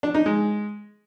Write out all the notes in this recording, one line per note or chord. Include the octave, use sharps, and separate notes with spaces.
D4
D#4
G#3